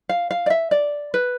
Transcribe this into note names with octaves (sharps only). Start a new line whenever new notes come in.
F5
F5
D5
E5
D5
B4